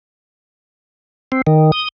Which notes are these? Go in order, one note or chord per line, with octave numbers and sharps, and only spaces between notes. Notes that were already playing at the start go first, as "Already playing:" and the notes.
C4
D#3
D#6